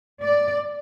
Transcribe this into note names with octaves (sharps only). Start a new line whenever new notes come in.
D5